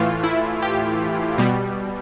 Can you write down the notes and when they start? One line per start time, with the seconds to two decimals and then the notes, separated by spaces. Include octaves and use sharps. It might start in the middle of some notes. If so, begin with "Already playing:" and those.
Already playing: A2 E3 A3 F4
0.24 E4
0.62 G4
1.38 B2 G3